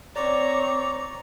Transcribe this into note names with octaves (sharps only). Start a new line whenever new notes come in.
C4 C#5 D5 A#5 D6